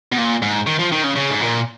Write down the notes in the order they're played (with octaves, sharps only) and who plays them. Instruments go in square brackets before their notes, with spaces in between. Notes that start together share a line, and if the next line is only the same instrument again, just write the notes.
[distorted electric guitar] B2
A#2
G#2
D#3
F3
D#3
C#3
C#3
G#2
A#2